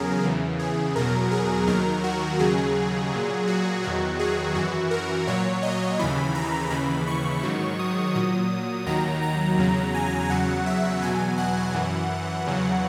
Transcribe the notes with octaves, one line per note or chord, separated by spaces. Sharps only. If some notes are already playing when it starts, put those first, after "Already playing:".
Already playing: E2 C#3 F#3 G#4 A#4
E2 C#3 E3
G#4
E2 B2 F#3 A#4
G#4
D#2 D#3 F#3 A#4
F#4
D#2 C#3 F#3 G#4
A#2 F#3
F#4
E2 D#3 F#3 F#4
G#4
F#2 E3 F#4
A#4
A#2 F#3 C#5
D#5
D#2 C#3 E3 B5
A#5
D#2 C#3 E3 B5
C#6
G#2 D#3 F#3
D#6
A#2 F#3 D#6
D#2 D#3 F#3 A#5
A#5
E2 C#3 F#3
G#5
E2 C#3 F#3 F#5
E5
E2 B2 F#3 G#5
F#5
F#2 E3
E2 C#3 F#3